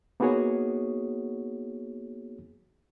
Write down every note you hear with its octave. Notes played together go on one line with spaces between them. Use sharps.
A#3 B3 D#4 F#4 G#4 C#5